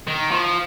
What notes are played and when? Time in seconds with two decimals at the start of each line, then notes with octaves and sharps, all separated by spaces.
0.08 D#3
0.31 F3